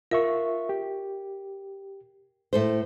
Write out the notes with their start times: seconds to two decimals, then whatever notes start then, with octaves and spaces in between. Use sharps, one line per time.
0.11 F4 A#4 E5 C#6
0.69 G4
2.53 A2 A4 C5